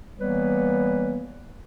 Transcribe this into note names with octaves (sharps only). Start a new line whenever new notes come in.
E3 G3 A#3 B3 B4 C#5